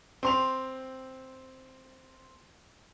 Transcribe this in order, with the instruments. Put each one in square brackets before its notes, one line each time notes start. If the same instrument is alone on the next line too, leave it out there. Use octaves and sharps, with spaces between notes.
[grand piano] C4 C6 F7